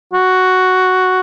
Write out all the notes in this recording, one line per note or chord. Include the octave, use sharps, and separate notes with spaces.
F#4